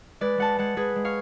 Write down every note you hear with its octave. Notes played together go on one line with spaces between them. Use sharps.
G#3 B4 D5
G#3 F#5 A5
G#3 F#5 A5
G#3 G#4 B4
G#3
C#5 F5